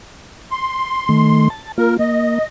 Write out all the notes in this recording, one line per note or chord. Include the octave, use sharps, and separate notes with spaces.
C6
D#3 A3
A5
A#3 F4 A#4
A#3 D#5